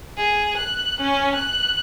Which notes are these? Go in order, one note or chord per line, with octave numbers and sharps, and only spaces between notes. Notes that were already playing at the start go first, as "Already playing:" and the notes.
G#4
F#6
C#4
F#6